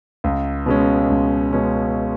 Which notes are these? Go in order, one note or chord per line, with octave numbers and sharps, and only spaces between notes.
C#2
B2 G#3 C#4
C#2
B2 G#3 C#4